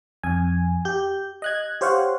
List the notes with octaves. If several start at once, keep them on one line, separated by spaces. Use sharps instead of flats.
F2 G#5
G4 G6
D#5 F#6 G#6
G4 C5 C#5 F5 F#5